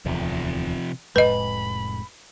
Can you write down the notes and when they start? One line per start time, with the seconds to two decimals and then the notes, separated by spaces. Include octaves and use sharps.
0.06 D1 E2 C3 F3
1.16 F1 A2 G#3 B4 D#5 B5